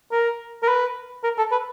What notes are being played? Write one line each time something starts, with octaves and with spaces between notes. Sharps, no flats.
A#4
A#4
B4
A#4
A4
B4